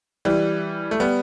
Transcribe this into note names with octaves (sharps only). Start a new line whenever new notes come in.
E3 G3
A3
G3 B3